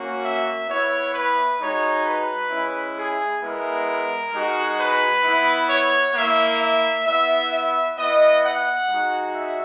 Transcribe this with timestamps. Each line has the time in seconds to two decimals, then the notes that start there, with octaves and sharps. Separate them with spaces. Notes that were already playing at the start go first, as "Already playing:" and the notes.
Already playing: A#3 C#4 F#4
0.22 E5
0.66 B3 E4 C#5
1.12 B4
1.58 G#3 D#4 F#4 C#5
2.04 B4
2.49 G#3 C#4 E4
2.95 G#4
3.41 G#3 B3 E4 A#4
4.32 G#3 D#4 F#4
4.77 B4
5.23 B3 E4
5.68 C#5
6.14 A#3 E4 E5
6.59 E5
7.05 B3 E4 E5
7.50 E5
7.96 B3 E4 D#5
8.42 F#5
8.87 G#3 D#4 F#4
9.33 E5